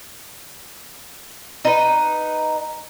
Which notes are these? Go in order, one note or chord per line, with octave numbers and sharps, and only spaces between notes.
D#4 B4